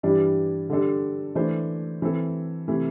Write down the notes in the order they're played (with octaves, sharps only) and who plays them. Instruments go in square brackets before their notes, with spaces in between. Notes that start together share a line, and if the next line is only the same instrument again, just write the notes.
[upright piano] G2 E3 G3 D4
D3 G3 D4 A4
E3 A3 D4 C5
E3 C4 A4
C3 E3 A3